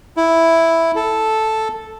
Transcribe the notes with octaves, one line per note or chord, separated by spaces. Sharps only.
E4
A4